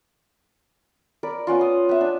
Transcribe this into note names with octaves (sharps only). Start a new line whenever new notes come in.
A#4 D5 B5
B3 C#4 F4
D#6
B3 E5 F#5
D4